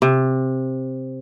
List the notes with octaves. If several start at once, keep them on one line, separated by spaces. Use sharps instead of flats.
C3